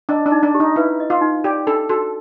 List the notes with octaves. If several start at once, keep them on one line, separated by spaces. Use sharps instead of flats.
D4 D#5
D4
D#4
D4
G4
D#4
E4 B4
D#5
F4
D#4
G4 D5
D4 A4
F#4 A4